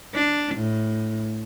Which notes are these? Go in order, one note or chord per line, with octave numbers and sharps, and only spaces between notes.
D4
A2